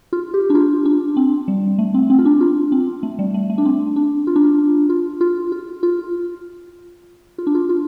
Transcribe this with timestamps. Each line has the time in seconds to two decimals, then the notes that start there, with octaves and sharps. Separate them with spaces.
0.13 F4
0.34 G4
0.50 D4
0.55 F4
0.85 D4
1.17 C4
1.48 G3
1.79 A3
1.94 C4
2.10 C4
2.19 F4
2.25 D4
2.41 F4
2.72 C4
3.03 A3
3.19 G3
3.34 A3
3.50 A3
3.58 D4
3.65 C4
3.96 D4
4.27 F4
4.36 D4
4.44 F4
4.89 F4
5.21 F4
5.52 F4
5.83 F4
7.38 F4
7.47 D4
7.55 F4
7.69 F4